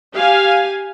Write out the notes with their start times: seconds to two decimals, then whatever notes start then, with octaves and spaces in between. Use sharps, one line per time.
0.13 G4 F5 G#5